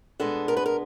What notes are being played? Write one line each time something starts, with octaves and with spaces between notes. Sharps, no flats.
B2 G#3 B3 D4 A4
A#4
B4
A#4